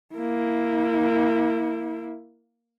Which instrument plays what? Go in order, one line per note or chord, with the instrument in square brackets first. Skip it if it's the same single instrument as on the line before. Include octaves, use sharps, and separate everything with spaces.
[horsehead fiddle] A#3 E4